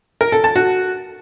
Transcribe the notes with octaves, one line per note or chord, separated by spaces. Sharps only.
A#4
A4
A5
F#4